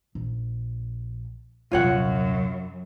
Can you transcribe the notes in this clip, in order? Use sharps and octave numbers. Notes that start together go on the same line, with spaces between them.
A#1
D#1 F#2 C3 F4 C#5 F#5